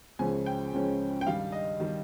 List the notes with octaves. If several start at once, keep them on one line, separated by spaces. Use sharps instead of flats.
C#2 C#3 F3 G#3 C#4 G#5
G5
C#2 C#3 F3 G#3 C#4
G5
G2 D#3 G3 F5
D#5
D#3 G3